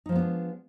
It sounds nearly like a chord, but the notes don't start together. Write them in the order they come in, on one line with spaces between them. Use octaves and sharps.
D#4 F3 G#3 B3 D4